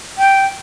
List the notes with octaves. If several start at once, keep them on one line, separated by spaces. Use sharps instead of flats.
G5